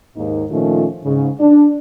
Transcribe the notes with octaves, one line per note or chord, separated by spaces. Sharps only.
D#2 G#2 A#3 D#4
A#2 D#3 F3 A3 C#4 F4
G#2 C#3
D4